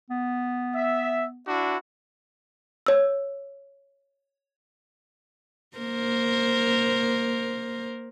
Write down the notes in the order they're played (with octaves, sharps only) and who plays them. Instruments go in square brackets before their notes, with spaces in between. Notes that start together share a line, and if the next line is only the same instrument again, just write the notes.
[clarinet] B3
[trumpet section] E5
D4 E4 F#4
[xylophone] C#5 E6
[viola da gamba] A#3 A#4 C5